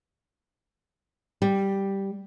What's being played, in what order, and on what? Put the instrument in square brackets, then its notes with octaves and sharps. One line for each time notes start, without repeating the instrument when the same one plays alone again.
[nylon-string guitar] G3